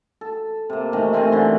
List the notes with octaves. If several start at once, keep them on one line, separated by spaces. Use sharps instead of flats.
A4
C3 A#3
C3 D#3 E3 A3
A3 C4 A#4 G#5
F#2 D3 E3 C6